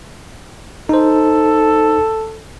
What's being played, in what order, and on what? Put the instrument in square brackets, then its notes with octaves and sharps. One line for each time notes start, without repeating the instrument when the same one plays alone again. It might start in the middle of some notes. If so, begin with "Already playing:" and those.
[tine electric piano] D#4 C5 [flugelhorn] A4